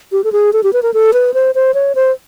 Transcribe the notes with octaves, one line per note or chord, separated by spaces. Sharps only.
G4
A4
G#4
A4
G4
B4
A#4
A4
B4
C5
C5
C#5
C5